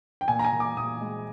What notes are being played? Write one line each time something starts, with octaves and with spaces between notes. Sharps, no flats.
G5
A#2 G#5
A#5
G#5
A#2
D6
A#2 D#6
G#3